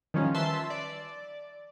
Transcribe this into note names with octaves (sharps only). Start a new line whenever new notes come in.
D#3 F3 G3 C#4 F4
B4 E5 A5 C6 E6
D5